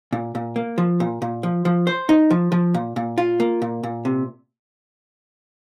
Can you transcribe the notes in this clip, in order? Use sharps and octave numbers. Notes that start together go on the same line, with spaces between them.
A#2
A#2
A#3
F3
A#2
A#2
F3
F3
C5
D#4
F3
F3
A#2
A#2
F4
A#3
A#2
A#2
C3